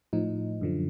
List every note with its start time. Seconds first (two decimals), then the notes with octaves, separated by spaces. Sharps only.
0.13 A2 F3 D#4
0.61 F#2 D3 F3